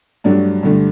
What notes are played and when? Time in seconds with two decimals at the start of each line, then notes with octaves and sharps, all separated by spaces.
0.24 G2 F#3 A3 D4
0.63 G2 D3 A3